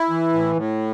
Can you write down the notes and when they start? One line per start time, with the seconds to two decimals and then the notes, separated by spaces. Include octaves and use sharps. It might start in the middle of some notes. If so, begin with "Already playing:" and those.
Already playing: E4
0.10 E3
0.33 A2
0.56 A2